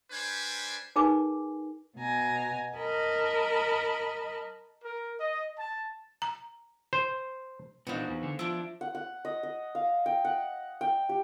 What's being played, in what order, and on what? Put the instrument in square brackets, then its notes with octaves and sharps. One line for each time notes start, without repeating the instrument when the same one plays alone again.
[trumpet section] G3 D4 B4 C5 G#5
[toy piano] D#4 G#4 A#4 B4 G#5 D6
[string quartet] B2 G#5 A#5
A#4 D#5 A5 B5
[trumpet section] A#4
D#5
A5
[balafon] A#5
[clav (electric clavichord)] C5
[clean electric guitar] A#2 E3 D4 [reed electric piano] B3 C5 F5 [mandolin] D#4 F#4
[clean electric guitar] E2
D3
[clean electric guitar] F3 [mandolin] D4 E4
[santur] F#5
F#5
D#5
D#5
F5
G5
F#5
G5
G4